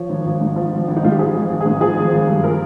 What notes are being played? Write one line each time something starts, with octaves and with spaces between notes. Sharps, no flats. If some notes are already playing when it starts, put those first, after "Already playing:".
Already playing: F3 C#5
G#1
G#1
G#2
F3
G#1
G#1
D#4
G#2 F4
G4
F3 G#4
G#1
G#1
G#4
G#2
F3 G#4
G#1
G#1
G2
F3 A#4